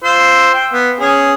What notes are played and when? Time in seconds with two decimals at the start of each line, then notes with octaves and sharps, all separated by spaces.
0.04 F4 C5 E6
0.54 G5
0.73 B3
1.00 C#4 G#4